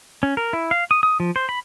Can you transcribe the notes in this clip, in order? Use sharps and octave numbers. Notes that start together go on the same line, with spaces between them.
C#4
A#4
E4
F5
D#6
D#6
F3
C5
B5